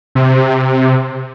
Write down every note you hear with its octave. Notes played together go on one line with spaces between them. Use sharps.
C3